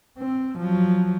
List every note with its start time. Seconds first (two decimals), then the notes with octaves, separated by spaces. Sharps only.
0.18 C4
0.59 F3 F#3